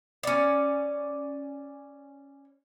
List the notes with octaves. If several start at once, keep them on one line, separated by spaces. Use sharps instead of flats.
C#4 D5